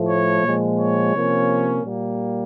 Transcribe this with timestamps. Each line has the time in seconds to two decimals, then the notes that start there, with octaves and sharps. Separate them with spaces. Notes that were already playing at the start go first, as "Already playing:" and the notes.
Already playing: A2 F3 A3
0.08 C#5
0.43 A#2 F3 G#3
0.79 C#5
1.14 C3 F3 A#3 C#4
1.85 A#2 G3 A#3